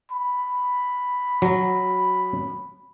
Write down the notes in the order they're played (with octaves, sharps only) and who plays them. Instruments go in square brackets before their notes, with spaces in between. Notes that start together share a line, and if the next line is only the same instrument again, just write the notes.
[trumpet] B5
[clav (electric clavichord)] F#3